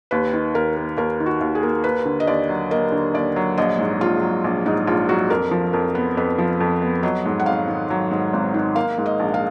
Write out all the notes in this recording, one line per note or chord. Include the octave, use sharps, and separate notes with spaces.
D#2 B4
D#3
D#2 A#4
A#3
D#2 A#4
D#3
F#4
D#2
G#4
A#3
A#3 B4
D3
D#5
D#2 D5
F#3
A#3 D#5
D3
D#2 D5
F#3
A#1 D#5
G#2
A#1 F4
F#3
A#1
G#2 D#4
A#1 F4
F#3 F#4
F2 A#4
F3
F2 A#4
B3
F2 B4
F3
F2
B3
F#3 D#5
G#2
F#5
G#1 F5
D#3
F#3
G#2
G#1
D#3
A#3 F5
G#2
D#5
A#1
F5